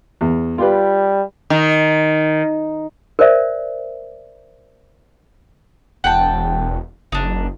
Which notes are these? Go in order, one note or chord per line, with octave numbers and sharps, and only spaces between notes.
E2
G3 F4 G4 B4
D#3
A#4 C5 D5 E5
E1 F#5 G5 A5
F#1 D4 D#4